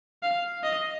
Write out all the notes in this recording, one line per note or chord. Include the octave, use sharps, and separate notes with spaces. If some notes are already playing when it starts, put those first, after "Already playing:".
F5
D#5